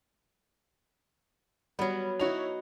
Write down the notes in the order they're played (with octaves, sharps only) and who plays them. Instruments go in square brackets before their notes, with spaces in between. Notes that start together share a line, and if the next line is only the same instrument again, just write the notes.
[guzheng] F#3 B3 [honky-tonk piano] G3
[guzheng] D#4 F#4 [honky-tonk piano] E4 C#5 F7